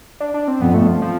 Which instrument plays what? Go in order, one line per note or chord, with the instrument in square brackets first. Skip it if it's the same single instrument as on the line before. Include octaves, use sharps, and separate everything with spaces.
[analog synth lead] D4
D4
C4
[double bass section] F2 [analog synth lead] B3
[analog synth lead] A3
F3
F3